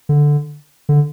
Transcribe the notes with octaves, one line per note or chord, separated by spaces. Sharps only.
D3
D3